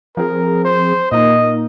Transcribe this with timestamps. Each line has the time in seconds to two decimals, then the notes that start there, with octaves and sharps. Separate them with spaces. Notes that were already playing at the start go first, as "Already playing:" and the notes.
0.17 F3 C4 G#4 A#4
0.65 C5
1.12 A#2 A#3 D#4 A#4 D#5